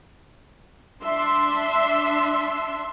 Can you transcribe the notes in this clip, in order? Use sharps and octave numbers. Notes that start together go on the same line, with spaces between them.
D4 E5 C6